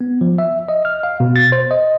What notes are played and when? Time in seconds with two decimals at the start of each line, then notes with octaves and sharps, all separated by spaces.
0.01 B3
0.21 F3
0.38 E5
0.69 D#5
0.85 F6
1.03 F5
1.20 B2
1.36 A6
1.52 C5
1.71 D#5